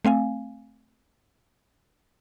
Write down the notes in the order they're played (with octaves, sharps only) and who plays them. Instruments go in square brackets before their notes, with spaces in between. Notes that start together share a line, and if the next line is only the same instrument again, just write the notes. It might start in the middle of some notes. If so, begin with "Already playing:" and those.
[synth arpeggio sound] A3 C4 F5 G#5